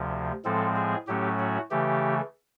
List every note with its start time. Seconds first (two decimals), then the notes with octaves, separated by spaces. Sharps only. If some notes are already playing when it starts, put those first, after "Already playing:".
Already playing: D2 C3 F3
0.45 A2 F3 G#3 C4 A4
0.76 G#4
1.08 A2 F#3 A3 C#4 G4
1.39 F#4
1.71 C#3 E3 A3 G4